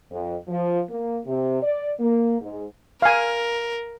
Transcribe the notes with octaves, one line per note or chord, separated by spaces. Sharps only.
F2
F3
A#3
C3
D5
A#3
G#2
A#4 F5 G#5